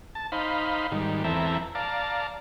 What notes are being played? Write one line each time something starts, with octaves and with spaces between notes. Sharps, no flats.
A5
D#4 C5 F5 B5
G#2 D#3 G3
E2 E3 C4 A4 E5 A#5
D5 F5 A5 A#5